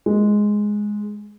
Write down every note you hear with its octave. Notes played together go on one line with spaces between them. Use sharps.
G#3